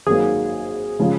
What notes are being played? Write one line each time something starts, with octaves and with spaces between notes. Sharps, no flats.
G#1 G#2 D#3 F#3 A#3 G#4
C#3 F3 G#3